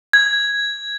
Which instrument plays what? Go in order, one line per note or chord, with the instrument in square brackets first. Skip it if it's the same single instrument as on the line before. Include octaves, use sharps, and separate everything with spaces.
[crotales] G#6